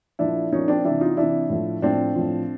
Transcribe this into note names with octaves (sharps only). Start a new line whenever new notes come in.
A#2 F3 D4 E4
A#2 F3 C#4 D#4
C4 D4
C3 E3 D4 E4
D#4 F4
C3 E3 D4 E4
A2 F3
A2 F3 C4 D4
A2 F3